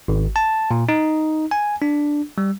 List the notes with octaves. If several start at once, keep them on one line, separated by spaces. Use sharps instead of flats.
G#1
A5
A#2
D#4
G#5
D4
G3